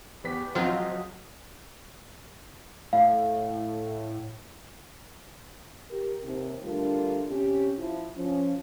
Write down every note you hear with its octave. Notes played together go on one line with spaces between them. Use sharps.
E2 B3 G4 B6
C#2 F3 F#3 C4 F4 D#5
A2 F5
G4 A#4
D#2 C3
D3 G3 A3 D4 F4 A#4
C3 C#4 G4
F3 E4
F3 C#4